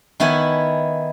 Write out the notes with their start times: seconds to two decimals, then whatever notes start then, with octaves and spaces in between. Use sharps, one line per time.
0.20 D#3 B3 E4 C#5 G#5